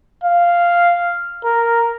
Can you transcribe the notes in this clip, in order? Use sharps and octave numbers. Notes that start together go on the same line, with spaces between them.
F5
A#4